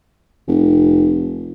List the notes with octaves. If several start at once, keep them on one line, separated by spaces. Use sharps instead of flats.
F1